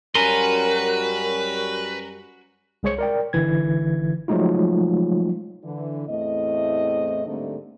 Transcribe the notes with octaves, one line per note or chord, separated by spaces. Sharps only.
F#2 G3 C#4 F#4 A#4 B4 G#5 C6
C2 G#3 G#4 C5 C#5 C#7
A#4 D5 G5
G1 D3 E3 G#6
F3 F#3 G#3 A3 D#4 F4
D3 E3
E2 A2 A3 C4 D#5
G#2 D3 G3 A3 A#3 C4